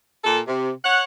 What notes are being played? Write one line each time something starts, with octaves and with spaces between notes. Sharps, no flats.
A#2 A4
C3
C#5 F#5